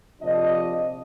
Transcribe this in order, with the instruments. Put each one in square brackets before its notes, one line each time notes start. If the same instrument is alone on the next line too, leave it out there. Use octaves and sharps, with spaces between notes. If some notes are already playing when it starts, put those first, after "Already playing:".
[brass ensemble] A#1 C3 F3 D4 D#5